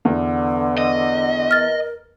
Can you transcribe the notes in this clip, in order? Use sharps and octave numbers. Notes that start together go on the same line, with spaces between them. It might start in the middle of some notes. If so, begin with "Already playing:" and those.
E2 D3
D#5
A#4 F6 A6